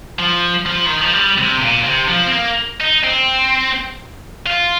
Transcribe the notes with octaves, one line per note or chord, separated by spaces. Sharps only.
F3
F3
D#3
F3
G3
C3
A#2
C3
F3
C4
A#3
D#4
C4
F4